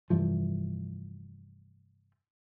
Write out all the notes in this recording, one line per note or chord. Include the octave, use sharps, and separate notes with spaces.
F1 G2 E3 F3